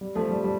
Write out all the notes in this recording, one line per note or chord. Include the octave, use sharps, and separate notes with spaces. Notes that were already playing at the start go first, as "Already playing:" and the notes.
G3
F3 A3
G3
G3